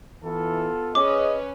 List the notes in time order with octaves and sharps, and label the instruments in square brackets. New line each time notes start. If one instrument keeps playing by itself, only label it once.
[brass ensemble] E3 [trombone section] B3 F4 A4
[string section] C#4 B4 [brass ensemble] G#4 D#5 [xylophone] D6